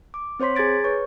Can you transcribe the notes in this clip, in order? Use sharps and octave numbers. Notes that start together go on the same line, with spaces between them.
D6
C4 C5 C#5 C6 B6
G#4 A#5 G#6 A6 D7
B4 C#5 C#6